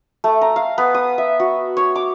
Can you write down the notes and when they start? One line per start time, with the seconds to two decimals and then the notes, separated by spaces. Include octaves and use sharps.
0.24 A3
0.41 A#5
0.56 F5
0.78 B3
0.94 D#6
1.18 E5
1.40 F#4
1.77 C#5
1.96 D6